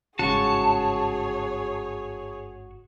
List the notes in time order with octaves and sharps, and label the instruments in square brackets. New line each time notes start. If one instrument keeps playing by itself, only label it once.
[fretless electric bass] G1 G#2 C#3 [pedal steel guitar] F#4 C#6 [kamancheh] G#4 C#5 [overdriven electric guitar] A5